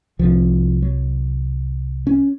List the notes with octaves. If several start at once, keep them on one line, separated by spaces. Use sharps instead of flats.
C2 C3 F3
F#3
C#4